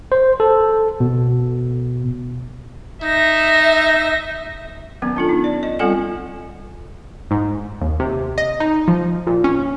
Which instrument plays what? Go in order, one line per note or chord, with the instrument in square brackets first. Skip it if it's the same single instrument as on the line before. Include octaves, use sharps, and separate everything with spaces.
[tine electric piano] C5
A4
B2
[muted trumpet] D#4 [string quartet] E5 A#6
[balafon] D#3 F#3 B3 C#4
D4 F4 A4
D#4
D5
D#5
G3 C4 F4 A4 F#5 G#5
[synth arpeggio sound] G#2
D#2
C3
D#5
D#4
F3
A#2
C#4